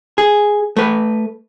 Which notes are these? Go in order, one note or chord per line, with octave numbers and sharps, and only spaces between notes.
G#4
A3 B4